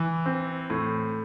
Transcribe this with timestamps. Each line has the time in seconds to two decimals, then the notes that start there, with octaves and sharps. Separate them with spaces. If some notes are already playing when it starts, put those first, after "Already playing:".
Already playing: E3
0.26 C4
0.70 A2